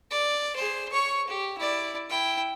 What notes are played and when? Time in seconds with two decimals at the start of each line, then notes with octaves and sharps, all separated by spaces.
0.11 D5
0.56 G#4 C5
0.92 C#5 C#6
1.28 G4
1.58 E4 D5
2.09 E4 G5